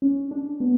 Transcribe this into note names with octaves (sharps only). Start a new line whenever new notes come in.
C#4
D4
B3